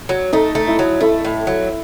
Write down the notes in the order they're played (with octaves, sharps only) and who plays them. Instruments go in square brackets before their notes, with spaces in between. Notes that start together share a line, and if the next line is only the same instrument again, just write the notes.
[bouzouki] F#3
[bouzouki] A3 [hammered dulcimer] D#4
[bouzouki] A3
[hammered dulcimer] E4
[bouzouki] F#3
[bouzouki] A3 [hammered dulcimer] E4
[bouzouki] A2
F#3